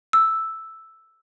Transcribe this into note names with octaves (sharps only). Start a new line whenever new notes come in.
E6